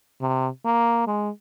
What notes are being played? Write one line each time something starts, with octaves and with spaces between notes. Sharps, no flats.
C3
A#3
G#3